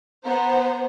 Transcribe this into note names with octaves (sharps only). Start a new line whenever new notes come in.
B3 C5 A#5